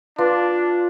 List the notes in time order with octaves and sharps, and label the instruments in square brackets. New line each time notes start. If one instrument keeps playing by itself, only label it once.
[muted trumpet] D4 [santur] F4 [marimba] B4